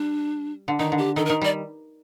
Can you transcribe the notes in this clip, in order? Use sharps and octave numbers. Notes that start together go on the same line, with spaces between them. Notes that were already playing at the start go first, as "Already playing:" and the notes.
Already playing: G3 D4
D3
D#3 D#4
D3
G4
D#3 A4
A#4
D#3
G3 D5